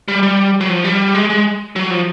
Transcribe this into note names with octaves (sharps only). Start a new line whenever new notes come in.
G3
G3
F#3
F3
G3
G#3
G#3
F#3
F3